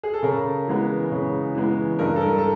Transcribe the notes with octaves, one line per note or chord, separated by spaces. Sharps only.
G#4
A4
C#3 A#4
E3 G#3 B3
C#3
E3 G#3 B3
G2 A#4
A4
A#4
A4